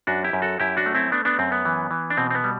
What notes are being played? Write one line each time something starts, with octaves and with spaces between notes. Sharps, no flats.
F#2 D4 F#4
E4 G4
F#2
F#4 A4
F#2 E4 G4
D4 F#4
A3
C4 E4
A3 B3 D4
B3 D4
F#2 C4
B3
E3
E3
D4
B2 C4
C4
B3
G3